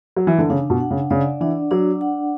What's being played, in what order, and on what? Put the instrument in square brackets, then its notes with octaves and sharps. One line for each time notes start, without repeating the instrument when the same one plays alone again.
[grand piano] F#3
E3
D3
[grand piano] C#3 [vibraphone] D4
[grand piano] B2
[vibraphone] F#5
[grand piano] C#3
[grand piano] C#3 [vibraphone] D5
[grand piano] E3 [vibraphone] D4
[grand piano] F#3 [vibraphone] D4
[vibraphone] F#5